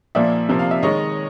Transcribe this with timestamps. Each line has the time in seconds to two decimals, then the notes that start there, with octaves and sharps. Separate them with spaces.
0.15 A#2 F3 A#3 D5 E5
0.49 C3 F3 A#3
0.59 F5
0.71 E5
0.83 D#3 G#3 C#5 D#5